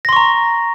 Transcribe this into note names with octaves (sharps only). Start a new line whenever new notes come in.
A#5 C6 C#6 A#6